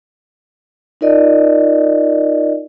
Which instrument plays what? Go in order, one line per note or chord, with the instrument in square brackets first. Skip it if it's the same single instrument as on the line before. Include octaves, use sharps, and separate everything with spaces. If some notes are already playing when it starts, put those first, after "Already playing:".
[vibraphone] D#4 F4 A#4 D5 D#5